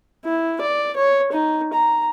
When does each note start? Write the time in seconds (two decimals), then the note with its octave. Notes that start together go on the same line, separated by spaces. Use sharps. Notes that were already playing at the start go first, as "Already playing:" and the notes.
0.25 E4
0.61 D5
0.97 C#5
1.32 D#4
1.74 A#5